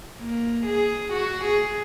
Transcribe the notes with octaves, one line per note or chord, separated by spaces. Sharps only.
A#3
G#4
F#4
G#4